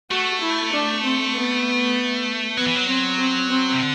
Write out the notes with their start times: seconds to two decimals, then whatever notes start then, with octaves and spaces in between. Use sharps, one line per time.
0.11 A3 F#4
0.41 E4
0.73 D4
1.03 C4
1.34 B3
2.57 F#3 B3
2.67 E3
2.76 F#3
2.88 C4
3.18 C4
3.49 C4
3.73 C3
3.80 D3